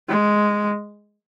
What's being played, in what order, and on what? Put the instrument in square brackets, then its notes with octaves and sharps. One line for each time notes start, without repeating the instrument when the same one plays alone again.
[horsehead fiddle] G#3